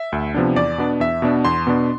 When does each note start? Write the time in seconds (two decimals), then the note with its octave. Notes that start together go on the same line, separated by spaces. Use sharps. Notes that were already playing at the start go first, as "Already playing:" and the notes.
Already playing: E5
0.12 D2
0.34 C3 F3 B3 D4
0.56 E2 D5
0.78 B2 B3 D4
1.00 E2 E5
1.22 B2 B3 D4
1.45 E2 C6
1.67 B2 B3 D4